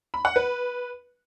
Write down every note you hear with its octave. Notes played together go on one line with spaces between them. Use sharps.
B5
F#5
B4